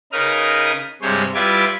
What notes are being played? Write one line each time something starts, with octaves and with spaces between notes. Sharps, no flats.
C#3 D#4 A#4 B4 D#6 F6
G2 C3 G#3 C5 C#5
G3 E4 F4 B4 D6 G#6